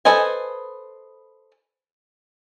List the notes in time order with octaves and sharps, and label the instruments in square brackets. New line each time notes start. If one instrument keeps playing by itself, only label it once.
[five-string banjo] A4 B4 C5 D#5 G#5